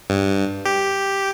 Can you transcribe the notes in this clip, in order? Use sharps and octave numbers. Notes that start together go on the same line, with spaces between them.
G2
G4